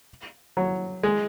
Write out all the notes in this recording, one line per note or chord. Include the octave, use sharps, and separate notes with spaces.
F#3
G#3